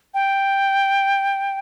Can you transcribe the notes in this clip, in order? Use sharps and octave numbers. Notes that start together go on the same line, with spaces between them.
G5